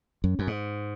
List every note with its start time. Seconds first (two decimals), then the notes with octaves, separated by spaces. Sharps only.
0.24 F#2
0.39 F#2
0.47 G#2